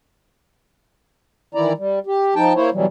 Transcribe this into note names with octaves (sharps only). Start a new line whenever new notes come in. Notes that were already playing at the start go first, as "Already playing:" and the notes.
D#3 E3 E4 D5 A#5
G3
G4
F3 D#4 G5 A5
A#3 E4 C5 C#5
B2 E3 F#3 G3